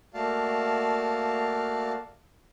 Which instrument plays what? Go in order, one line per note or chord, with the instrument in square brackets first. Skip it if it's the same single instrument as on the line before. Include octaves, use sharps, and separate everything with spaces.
[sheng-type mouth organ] A3 A#3 F#4 D5 F5 A5